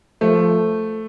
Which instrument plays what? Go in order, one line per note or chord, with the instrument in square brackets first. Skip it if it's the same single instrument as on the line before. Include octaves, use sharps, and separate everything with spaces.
[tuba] F3 [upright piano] A3